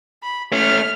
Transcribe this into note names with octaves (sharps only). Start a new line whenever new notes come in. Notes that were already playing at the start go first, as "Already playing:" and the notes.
B5
A3 C#4 F6